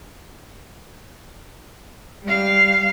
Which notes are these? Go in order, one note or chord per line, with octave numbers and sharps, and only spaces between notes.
G3 F5